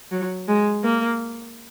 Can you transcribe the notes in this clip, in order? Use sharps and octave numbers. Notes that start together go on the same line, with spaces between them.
F#3
G#3
A#3